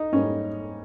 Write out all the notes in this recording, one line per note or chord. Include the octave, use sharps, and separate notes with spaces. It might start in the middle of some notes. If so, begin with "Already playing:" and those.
Already playing: D#4
G#2 G3 A#3 C#4